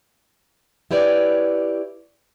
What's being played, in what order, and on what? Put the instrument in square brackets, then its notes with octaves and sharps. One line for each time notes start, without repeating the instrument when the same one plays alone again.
[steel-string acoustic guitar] E4 G4 B4 C#5 D5